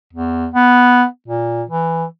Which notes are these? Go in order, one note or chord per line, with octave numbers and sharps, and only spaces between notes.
E2
B3
A#2
E3